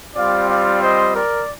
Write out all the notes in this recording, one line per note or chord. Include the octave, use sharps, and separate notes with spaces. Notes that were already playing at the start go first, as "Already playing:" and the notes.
G3 C4 F4 D5 F5
D5 F5
C5 D#5
A#4 D5